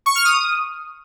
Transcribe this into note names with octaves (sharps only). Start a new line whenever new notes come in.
C#6
F6
D#6